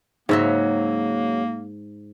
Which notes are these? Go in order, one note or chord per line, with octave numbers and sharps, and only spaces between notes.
G#2 C#3 F3 F#3 A#3 E5